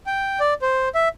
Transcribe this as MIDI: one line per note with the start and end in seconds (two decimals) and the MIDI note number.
0.06 0.40 79
0.40 0.54 74
0.62 0.89 72
0.95 1.09 76